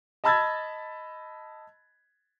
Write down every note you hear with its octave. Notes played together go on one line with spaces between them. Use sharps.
D#5 A5 B5 E6 G#6 A6